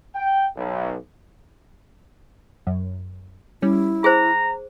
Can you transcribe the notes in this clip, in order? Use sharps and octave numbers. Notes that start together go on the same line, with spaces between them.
G5
B1
F#2
G3 C#4 E4
G#4 C5 A#5